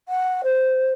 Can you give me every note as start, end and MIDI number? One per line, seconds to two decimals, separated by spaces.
0.08 0.41 78
0.43 0.92 72